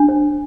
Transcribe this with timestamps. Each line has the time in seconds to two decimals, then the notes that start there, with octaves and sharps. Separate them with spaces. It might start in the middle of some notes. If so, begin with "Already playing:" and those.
Already playing: D4
0.09 C5